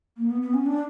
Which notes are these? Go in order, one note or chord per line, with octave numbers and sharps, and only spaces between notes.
A#3
B3
B3
C#4
D4